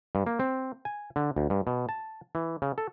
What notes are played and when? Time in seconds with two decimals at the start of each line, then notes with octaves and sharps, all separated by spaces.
0.15 G2
0.27 A#3
0.39 C4
0.85 G#5
1.16 D3
1.36 D2
1.50 G2
1.67 B2
1.89 A5
2.35 E3
2.62 C#3
2.78 A4